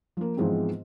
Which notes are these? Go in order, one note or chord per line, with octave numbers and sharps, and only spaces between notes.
F3 A#3
G#2 E3 F3 G#3 B3 C4